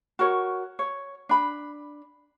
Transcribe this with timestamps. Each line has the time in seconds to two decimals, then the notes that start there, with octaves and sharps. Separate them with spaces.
0.19 F#4 A#4 C#5
0.79 C#5
1.29 D4 B5